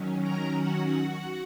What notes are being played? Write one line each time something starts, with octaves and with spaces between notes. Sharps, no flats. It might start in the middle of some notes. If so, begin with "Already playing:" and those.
Already playing: D#3 F#3 C#4
A#4 A#5
F#4 F#5